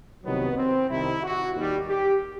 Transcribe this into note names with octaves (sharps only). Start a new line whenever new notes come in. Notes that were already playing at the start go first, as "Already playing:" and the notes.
C2 C3 D#3 F#3 B3
C4
C2 C3 D#3 E4
F#4
D#2 D#3 G3
G4